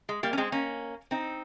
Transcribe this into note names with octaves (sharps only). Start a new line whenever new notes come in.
G#3
G3 A#3
C#4
G#3 C4
A#3 C#4
C4 D#4